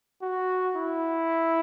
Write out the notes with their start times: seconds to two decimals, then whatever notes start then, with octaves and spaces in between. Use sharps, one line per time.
0.22 F#4
0.75 E4